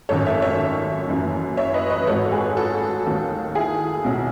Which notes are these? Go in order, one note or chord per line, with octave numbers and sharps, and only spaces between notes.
G#1 F#2 D#3 A4 C#5
C#5 E5
C#5 E5
F#1 F#2 E3
C#5 E5
B4 D#5
B4 D#5
G#1 G#2 F#3 A4 C#5
G#4 B4
F#4 A4
D#2 D#3 F#3
E4 G#4
B1 B2 F#3